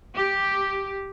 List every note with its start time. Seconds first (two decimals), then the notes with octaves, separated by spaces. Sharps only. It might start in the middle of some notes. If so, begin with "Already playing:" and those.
0.15 G4